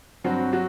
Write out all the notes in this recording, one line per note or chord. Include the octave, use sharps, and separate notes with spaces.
G2 F#3 C4 F#4
F#3 F#4